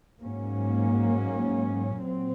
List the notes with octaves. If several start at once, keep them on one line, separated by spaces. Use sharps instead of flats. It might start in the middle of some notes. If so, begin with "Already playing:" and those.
G#2 F#3 A#3 C#4
A#2 F#3 C4